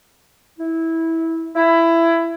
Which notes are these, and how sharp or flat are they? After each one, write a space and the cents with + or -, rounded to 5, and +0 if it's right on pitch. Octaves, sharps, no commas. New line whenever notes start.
E4 -15
E4 +15